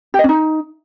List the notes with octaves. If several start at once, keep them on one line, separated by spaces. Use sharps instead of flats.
G4
D#5
C#4
D#4